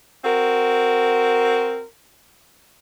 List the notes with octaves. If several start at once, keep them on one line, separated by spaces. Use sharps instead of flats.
C4 F#4 A#4